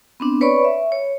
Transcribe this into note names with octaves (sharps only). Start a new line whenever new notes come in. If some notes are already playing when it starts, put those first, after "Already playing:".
B3 C4 D4
B4 C#5 D5 B5 C#6
E5
C#5